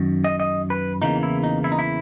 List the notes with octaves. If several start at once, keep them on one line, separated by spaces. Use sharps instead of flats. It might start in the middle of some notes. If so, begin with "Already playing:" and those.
Already playing: F#2 D#3
D#5
D#5
B4
E2 C#3 E3 A#3 D#4
E4
D#4
E4
D#4
E4